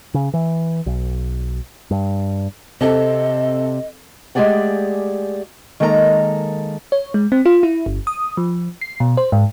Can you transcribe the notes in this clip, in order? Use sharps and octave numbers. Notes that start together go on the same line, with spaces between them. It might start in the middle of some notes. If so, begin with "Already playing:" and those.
C#3
E3
B1
G2
C3 C4 A4 D#5
G#3 A3 G4 G#4 D5 F#5
D#3 G#3 A#3 A4 D5 A#5
C#5
G#3
C4
F4
E4
G1
D#6
F3
C7
B2
C5
G#2